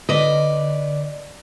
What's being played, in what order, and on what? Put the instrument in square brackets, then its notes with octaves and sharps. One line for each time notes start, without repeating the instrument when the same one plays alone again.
[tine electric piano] D3 [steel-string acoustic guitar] B4 D5 [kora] D#5